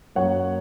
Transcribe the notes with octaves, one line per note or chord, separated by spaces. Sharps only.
F#2 F#3 A#3 C#5 F#5